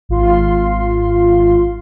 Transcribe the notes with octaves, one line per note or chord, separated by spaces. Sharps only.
G#1 F4 C6